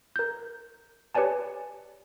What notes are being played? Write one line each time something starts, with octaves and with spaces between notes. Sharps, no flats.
A#4 G6
G4 B4 C#5 D5 G#5 A5